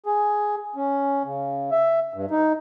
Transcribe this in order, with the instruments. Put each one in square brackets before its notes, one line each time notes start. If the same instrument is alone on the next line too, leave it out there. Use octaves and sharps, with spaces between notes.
[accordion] G#4
C#4
C#3
E5
G2
D#4